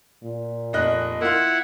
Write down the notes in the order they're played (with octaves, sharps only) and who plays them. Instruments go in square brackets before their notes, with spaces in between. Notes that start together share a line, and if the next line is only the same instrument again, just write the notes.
[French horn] A#2
[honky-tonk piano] F1 D#5 F#6
[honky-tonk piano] A#3 F4 [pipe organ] E4 F#5